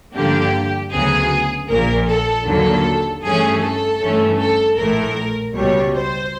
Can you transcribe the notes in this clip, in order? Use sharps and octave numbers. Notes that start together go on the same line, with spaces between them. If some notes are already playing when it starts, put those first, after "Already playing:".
G2 D3 F3 A#3 D4 G4
D2 C#3 F#3 B3 G#4
A#1 A#2 F3 A#4
A4
D#2 D3 F#3 A#3 A4
G2 E3 A3 C#4 G#4
A4
G2 E3 A3 C#4
A4
A#1 A2 E3 A3 A#4
C#2 B2 G3 C#5
C5